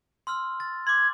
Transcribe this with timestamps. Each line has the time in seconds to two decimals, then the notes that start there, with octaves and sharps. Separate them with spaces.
0.27 C6 E6 F6
0.60 A6
0.87 C6 D6 G#6